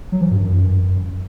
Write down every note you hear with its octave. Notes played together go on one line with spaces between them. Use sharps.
F#3
E3
G2
F#2